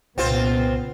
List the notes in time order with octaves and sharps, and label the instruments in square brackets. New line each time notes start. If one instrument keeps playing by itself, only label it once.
[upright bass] C2 [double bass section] A#2 C#3 B3 [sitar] C4 F4 C5